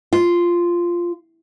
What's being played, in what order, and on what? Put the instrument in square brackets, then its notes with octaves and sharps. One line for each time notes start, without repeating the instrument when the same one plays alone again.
[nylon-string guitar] F4